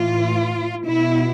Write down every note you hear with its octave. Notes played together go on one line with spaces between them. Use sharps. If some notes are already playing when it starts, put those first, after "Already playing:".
Already playing: A2 E3 F4
B2 E4